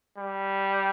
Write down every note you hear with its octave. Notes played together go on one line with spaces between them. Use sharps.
G3